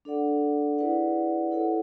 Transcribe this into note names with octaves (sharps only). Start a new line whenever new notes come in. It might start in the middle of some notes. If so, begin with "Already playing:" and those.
D4 A4 D5 F#5
E4 G#4 B4 D5 F#5
E4 A4 C#5 F#5